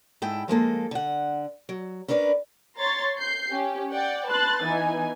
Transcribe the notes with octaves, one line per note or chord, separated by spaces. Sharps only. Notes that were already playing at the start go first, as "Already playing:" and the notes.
G#2 E4 A4 G5
F3 G#3 A#3 A4
D3 F#5
F#3
C#4 D4 A#4 B4 D5
C#5 A#5 C6 A6
G6 C7
C#4 G4
D5 F#5 G5
B4 A5 C6 F#6 A6
E3 B3 D#4 G#5